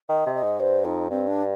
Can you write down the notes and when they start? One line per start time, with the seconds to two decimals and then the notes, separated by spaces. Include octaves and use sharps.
0.09 D#3 D#5
0.26 C3
0.34 D#5
0.43 G#2
0.59 G2 C5
0.84 F2 D#4
1.10 G2 C4
1.27 D4